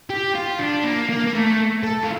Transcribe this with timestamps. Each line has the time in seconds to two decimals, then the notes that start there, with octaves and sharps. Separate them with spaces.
0.10 G4
0.34 F4
0.59 D4
0.84 A#3
1.09 A#3
1.26 A#3
1.34 A3
1.83 A4
2.03 F4